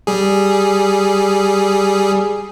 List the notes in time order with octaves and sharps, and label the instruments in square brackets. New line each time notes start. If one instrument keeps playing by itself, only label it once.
[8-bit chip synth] G3 G#4